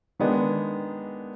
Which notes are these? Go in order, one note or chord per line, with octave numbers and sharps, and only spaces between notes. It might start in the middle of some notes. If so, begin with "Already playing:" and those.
D#3 G#3 B3 D4